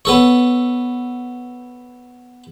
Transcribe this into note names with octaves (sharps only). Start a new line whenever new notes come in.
B3 A4 C#5